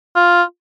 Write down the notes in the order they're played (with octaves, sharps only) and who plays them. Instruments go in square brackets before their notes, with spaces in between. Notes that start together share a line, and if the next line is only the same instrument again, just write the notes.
[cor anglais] F4